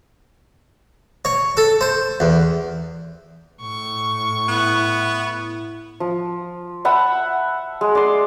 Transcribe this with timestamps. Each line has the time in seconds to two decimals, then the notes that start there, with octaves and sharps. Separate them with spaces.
1.25 C#5
1.57 A4
1.81 C5
2.20 E2
3.62 A2 C#6
4.48 B3 E4
6.00 F3
6.85 E5 F#5 A5 B5
7.81 G#3
7.95 D5 C6